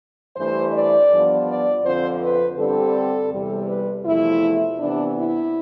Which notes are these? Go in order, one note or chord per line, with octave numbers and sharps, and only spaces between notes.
G2 E3 A3 C5
D5
G2 F3 B3
D5
F2 D3 F3 C4 C5
B4
G2 D3 G3 C4 A4
E2 C3 G3
B4
E2 C3 F3 A3 E4
C3 E3 B3 D4
E4